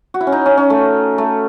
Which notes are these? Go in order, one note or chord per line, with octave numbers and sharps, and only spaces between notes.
F#4
E4
C#4
D#4
C#4
C#4
A3
A3